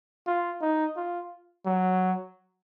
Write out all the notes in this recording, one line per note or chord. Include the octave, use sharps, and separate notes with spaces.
F4
D#4
F4
F#3